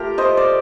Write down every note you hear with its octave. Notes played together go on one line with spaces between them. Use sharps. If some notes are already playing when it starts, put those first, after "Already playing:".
Already playing: A3 F4 G4 A#4
C5 D#5
D5